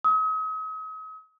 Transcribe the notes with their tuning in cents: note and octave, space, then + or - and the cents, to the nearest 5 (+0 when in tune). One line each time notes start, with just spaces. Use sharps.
D#6 +40